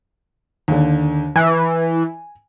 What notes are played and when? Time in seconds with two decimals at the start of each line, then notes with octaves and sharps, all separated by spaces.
0.68 D#2 D3
1.36 E3 G#5